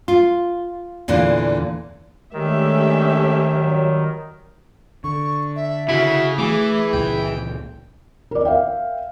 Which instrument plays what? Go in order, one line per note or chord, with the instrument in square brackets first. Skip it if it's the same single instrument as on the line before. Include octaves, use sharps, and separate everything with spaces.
[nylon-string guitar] F4
E2 A#2 D3 E3 D4
[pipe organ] D#3 [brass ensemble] G#3 A3 D4 [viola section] C#4 G4 E5
[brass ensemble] G#1 F#3 G3
[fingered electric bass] D3 [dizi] C#6
[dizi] E5
[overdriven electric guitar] C#3 [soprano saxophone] E4 [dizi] F#4
[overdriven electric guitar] E3 [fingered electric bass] A3 [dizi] G#4 [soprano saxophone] D6
[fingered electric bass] C#2 A#2 C#3 [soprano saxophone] G5
[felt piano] A#4 D5
A#4 E5 F5 G5